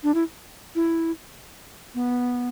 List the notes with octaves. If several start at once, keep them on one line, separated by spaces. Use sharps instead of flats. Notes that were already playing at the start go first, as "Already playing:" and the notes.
D4
E4
E4
B3